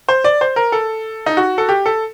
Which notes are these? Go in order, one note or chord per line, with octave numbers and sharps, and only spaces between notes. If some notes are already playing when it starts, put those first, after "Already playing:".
C5
D5
C5
A#4
A4
D#4
F#4
A4
G4
A4